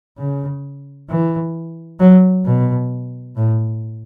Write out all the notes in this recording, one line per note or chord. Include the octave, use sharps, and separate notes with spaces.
C#3
E3
F#3
B2
A2